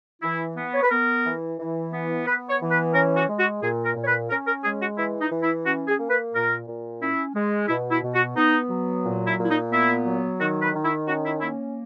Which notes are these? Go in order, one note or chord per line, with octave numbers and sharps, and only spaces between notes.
E3 E4
B3
C#5
B4
B3 A#4
E3
E3
B3
B3 B4
C#5
E3
B4
C#4 A#4
F#4
G#3
F#4
A#2 G#4
A#4
A#2
C#5
B4
C#4 A#4
A#4
G#3 G#4
F#4
E3 E4
D#4
E3
E4
C#4 F#4
G#4
A#3
B4
A#2 A#4
A#2
C#4 E4
G#3
B2 E4
E4
B2
F#4
B3 D#4
F#3
A#2
E4
A#2
E4
D#4
B3 E4
F#3
D#3 F#4
B4
D#3
E4
C#4 F#4
E4
A#3 E4